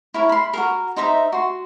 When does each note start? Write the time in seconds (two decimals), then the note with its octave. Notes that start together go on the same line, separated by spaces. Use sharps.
0.14 E4 A#4 C#5
0.29 B5 C6
0.53 F#4 G#4 A#4
0.97 D#4 C5 E5 A#5
1.32 F#4 C6